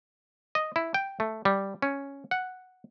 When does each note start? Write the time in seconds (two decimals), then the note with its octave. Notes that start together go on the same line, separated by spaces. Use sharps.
0.55 D#5
0.76 E4
0.94 G5
1.20 A3
1.45 G3
1.82 C#4
2.31 F#5